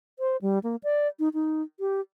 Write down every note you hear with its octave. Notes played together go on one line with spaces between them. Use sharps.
C5
G3
A#3
D5
D#4
D#4
G4